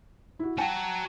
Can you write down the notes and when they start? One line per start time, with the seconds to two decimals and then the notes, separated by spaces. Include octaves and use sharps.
0.39 E4 F#4
0.58 F#4 F#5 G5 A5 A#5